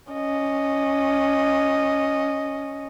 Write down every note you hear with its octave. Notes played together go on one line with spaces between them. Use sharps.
C#4 D#5